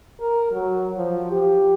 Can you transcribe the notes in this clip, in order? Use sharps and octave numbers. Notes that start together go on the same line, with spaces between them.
A#4
F#3
F3
G4